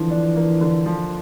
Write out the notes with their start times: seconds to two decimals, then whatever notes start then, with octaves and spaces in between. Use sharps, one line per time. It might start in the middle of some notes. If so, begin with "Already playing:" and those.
Already playing: D3 E3 F3
0.11 D4
0.36 A#3
0.61 D3
0.86 F3